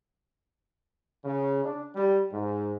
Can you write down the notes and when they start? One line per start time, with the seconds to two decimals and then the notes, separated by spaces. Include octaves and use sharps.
1.25 C#3
1.65 D4
1.95 G3
2.32 G#2